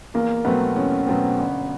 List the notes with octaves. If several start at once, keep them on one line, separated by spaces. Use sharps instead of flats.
E2 A#3
B2 F#3 A3 B3 C4
E2 C#4
B2 F#3 A3 C4
G1